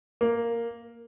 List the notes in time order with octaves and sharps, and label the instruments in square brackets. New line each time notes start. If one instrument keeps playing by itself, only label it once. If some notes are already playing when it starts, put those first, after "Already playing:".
[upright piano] A#3